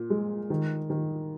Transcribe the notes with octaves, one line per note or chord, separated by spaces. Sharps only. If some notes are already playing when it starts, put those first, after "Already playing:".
Already playing: A#2
G#3
D#3
D#3